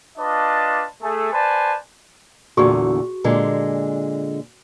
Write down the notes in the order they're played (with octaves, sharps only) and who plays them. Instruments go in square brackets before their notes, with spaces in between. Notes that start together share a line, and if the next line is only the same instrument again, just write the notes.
[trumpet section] D4 F4 B4 D5 D#5 A5
A3 G#4 A4
B4 C5 D5 G#5 A5
[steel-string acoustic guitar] E2 A#2 D3 [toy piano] F#4 G#4 C#6
[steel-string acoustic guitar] A#2 D3 G#3